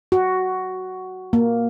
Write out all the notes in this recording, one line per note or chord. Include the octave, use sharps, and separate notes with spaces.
F#4
A#3